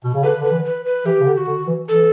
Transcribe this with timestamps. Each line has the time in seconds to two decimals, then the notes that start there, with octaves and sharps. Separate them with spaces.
0.04 B2
0.14 C#3
0.23 D3 B4
0.40 D3 B4
0.51 E3
0.65 B4
0.85 B4
1.06 E3 G4
1.20 C#3
1.27 D3
1.33 G4
1.37 F#4
1.47 D3
1.67 E3
1.88 E3 A4